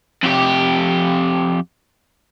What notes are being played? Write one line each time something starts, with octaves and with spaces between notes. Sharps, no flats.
F2 G4